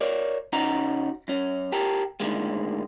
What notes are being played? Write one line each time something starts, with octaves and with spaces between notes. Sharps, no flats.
A#4 C#5 D5
C#3 C#4 D#4 F#4 A#5
F#2 C#4
G4 A4 A#4
A2 D3 D#3 G#3 A#3